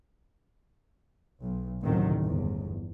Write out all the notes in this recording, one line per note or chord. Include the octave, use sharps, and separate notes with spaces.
B1
A1 D2 C3 D#3 F#3
G1 E2